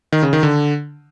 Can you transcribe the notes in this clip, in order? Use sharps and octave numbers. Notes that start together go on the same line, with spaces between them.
D#3
C#3
D#3
D3